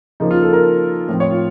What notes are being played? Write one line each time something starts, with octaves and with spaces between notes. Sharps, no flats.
C#3 F3 A#3 D#4
F4
A4
A#4
A2 F3 C4
C#5
F4